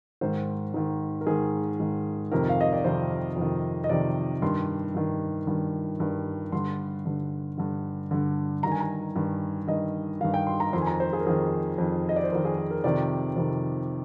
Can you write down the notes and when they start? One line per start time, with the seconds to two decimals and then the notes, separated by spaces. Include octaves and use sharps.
0.21 G#2 D#3 C5
0.74 G#2 D#3
1.21 A#4
1.27 G#2 D#3 G#4
1.80 G#2 D#3
2.32 F2 C3 D#3 A#4
2.49 F5
2.61 D#5
2.73 D5
2.84 F2 C3 D#3 C5
3.36 F2 C3 D#3
3.84 D#5
3.89 F2 C3 D#3 D5
4.42 G2 D#3 C6
4.94 G2 D#3
5.47 G2 D#3
6.00 G2 D#3
6.52 G2 D3 C6
7.05 G2 D3
7.58 G2 D3
8.11 G2 D3
8.63 G2 D#3 A#5
8.72 G#5
8.80 A#5
9.16 G2 D#3
9.68 G2 D#3 D#5
10.21 D#3 F5
10.25 G2
10.34 G5
10.47 C6
10.60 A#5
10.73 F2 D#3 C6
10.82 G#5
10.87 A#5
11.00 C5
11.13 G#4
11.20 A#4
11.26 F2 D#3 G#4
11.78 F2 D#3
12.09 D#5
12.16 D5
12.24 C5
12.32 F2 A#4
12.35 D#3
12.45 G#4
12.58 G#4
12.71 A#4
12.84 F2 C3 D#3 D5
13.36 F2 C3 D#3